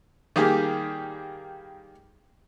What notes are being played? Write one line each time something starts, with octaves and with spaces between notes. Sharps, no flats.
D#3 G3 A#3 G4 G#4